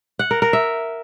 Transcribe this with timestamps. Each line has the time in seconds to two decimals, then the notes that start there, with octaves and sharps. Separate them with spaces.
0.19 F#5
0.31 A#4
0.42 A#4
0.53 E5